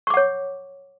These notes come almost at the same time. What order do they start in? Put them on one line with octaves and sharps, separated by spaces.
C#6 D6 F#5 C#5